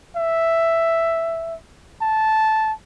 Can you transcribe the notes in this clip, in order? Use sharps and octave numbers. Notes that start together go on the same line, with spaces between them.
E5
A5